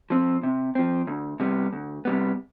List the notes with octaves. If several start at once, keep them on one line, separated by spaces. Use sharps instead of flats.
F3 C4
C3
F3 C4
D2
C3 G3 B3
D2
C3 G3 B3